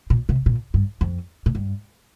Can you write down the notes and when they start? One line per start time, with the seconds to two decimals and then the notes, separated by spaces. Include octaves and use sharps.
0.10 A#2
0.29 C3
0.46 A#2
0.74 G2
1.01 F2
1.46 A#2
1.55 G2